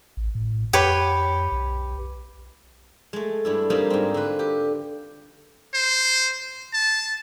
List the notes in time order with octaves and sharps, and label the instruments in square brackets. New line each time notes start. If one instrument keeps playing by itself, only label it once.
[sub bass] A1
A2
[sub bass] F2 [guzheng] G4 B4 C#5
[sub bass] B1
[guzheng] G#3 A3
G2 D4 E4
G3 A#3 C4 D#4 F4 G#4
G#2 C4
D3 B4
G4
[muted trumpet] C5
A5